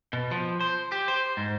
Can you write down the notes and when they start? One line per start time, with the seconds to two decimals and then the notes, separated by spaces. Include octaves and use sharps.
0.13 B2
0.31 F3
0.60 C5
0.92 G4
1.08 C5
1.37 G#2